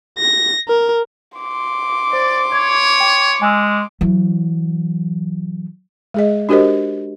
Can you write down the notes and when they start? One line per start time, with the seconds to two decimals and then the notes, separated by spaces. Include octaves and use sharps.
0.18 A#6
0.68 A#4
1.38 C6 D6
2.13 C5 D5
2.52 C#5 G#6
3.00 G5
3.42 G#3 G#5 E6
4.01 E3 F#3
6.14 G#3 G#4 D#5
6.49 D4 F#4 G4 A#4 C5 D#5